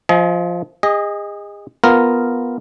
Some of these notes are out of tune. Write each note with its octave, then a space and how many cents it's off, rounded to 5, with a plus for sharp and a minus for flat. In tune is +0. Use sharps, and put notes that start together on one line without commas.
F3 +0 D#5 +30 G#5 +45
G#4 -35 D#5 +0
B3 +0 F4 +0 A#4 -5